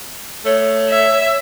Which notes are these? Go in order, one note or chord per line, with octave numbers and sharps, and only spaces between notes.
A3 C#5
E5